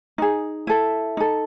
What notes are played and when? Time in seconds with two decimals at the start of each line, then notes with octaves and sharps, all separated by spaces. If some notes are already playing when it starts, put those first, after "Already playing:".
0.18 D#4 G#4
0.67 E4 A4
1.17 D#4 A4